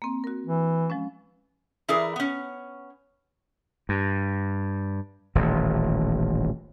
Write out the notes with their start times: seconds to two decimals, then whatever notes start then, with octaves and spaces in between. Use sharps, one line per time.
0.02 A#3 C4
0.24 F#4 A#4
0.47 E3
0.90 F3 G#3 C#4
1.88 E3 E4 G#4 A#4 D5
2.16 B3 C#4
3.89 G2
5.35 D#1 A1 D#2